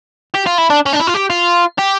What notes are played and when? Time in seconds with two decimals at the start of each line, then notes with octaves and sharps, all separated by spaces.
0.34 G4
0.46 F4
0.58 E4
0.70 D4
0.86 C#4
0.93 D4
1.00 E4
1.07 F4
1.14 G4
1.30 F4
1.78 G4